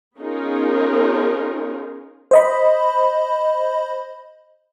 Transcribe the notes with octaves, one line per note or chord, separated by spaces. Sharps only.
B3 C#4 D#4 F4 G#4 A#4
C5 D#5 B5